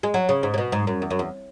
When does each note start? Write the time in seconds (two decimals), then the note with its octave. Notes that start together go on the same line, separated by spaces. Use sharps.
0.03 G#3
0.14 F#3
0.29 C#3
0.43 G#2
0.54 C#3
0.58 B2
0.72 G#2
0.87 F#2
1.02 E2
1.11 F#2
1.19 E2